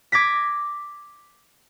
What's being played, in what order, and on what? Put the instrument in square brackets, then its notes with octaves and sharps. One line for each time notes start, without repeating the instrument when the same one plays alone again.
[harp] D6 G#6 A#6 B6